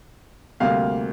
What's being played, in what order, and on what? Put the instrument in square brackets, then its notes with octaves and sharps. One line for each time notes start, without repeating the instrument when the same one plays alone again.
[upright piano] D2 C3 G3 A#3 F5